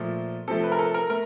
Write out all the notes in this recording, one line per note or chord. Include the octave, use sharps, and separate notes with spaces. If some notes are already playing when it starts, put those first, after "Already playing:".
Already playing: A#2 F3 A3
C3 F3 A3 A4
B4
A#4
A4
A#4
A3 A#4